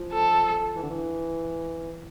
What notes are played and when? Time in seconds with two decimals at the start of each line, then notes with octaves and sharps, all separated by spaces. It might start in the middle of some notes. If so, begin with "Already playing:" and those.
Already playing: F3
0.13 A4
0.76 E3
0.83 D3
0.90 E3